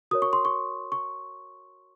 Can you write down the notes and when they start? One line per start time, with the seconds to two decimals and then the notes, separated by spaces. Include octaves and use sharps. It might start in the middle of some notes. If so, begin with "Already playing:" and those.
0.11 F#4 A#4 C#5 D#6
0.22 C#6
0.33 C6
0.45 C#6
0.92 C#6